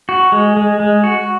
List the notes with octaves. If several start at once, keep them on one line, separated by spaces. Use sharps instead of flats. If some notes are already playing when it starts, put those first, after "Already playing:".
F#4
G#3
G#3
G#3
F#4